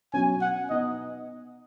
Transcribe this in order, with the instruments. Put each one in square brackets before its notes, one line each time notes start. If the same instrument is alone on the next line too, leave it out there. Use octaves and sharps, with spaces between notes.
[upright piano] B2 F#3 C#4 [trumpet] G#5
[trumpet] F#5
[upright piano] B2 B3 D#4 [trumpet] D#5